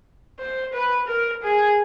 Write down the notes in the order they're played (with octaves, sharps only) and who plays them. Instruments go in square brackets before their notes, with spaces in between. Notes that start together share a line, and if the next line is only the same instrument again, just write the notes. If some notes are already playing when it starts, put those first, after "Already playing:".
[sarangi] C5
B4
A#4
G#4